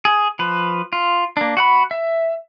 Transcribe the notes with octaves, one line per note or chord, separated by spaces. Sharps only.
G#4
F3 B4
F4
A#3 D4
F#4 F#5 B5
E5